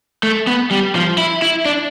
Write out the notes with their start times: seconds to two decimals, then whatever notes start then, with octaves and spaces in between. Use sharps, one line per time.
0.23 A3
0.47 B3
0.71 G3
0.95 F3
1.18 E4
1.42 E4
1.65 D4